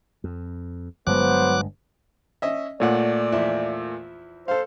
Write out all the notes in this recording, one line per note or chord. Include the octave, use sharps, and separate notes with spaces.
F2
G1 G2 F#3 G#3 B3 C5 D6 F#6
C#4 D#5 E5
A#2 A3 C#5 D5 F#5
E2 F3 E4
A4 C5 F5